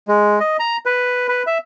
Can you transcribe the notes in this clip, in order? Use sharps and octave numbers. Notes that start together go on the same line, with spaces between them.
G#3
D#5
A#5
B4
B4
E5